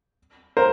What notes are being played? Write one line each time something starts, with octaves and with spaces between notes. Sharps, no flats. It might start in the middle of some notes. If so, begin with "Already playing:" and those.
A#4 C5